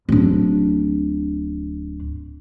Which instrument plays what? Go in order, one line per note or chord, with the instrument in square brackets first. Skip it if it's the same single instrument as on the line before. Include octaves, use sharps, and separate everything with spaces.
[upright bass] D1 D4